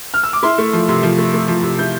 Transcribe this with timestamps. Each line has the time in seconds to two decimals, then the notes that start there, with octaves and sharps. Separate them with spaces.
0.14 F6
0.24 E6
0.33 D6
0.43 E4 C6
0.58 A3
0.73 F3
0.88 C3 C6
1.03 F3
1.18 A3
1.33 A3
1.48 F3
1.63 C3
1.79 E4 G6